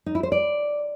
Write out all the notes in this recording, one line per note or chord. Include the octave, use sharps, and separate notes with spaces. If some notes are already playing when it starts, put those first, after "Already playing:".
D#4
E4
C5
D5